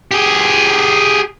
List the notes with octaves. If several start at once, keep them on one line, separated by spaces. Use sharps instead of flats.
G4 G#4